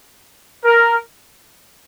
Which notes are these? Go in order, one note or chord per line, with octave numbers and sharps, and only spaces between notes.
A#4